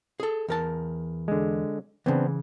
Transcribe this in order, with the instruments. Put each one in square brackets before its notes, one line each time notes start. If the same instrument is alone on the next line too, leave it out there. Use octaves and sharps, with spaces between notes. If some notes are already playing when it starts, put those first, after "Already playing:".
[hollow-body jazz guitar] G#4 A4
E2 A#4 A5
[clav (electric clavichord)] D3 G#3
[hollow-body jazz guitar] C#3 E3 [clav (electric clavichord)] B3 C4 D4